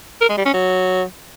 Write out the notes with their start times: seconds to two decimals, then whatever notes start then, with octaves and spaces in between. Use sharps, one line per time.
0.21 A#4
0.29 G#3
0.37 G3
0.46 C#4
0.54 F#3